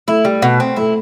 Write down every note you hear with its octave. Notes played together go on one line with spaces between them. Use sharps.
A3 E4
G3
B2
C4
A3 E4